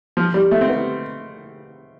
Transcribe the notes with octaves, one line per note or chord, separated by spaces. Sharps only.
F3
G3
A3
C4
B3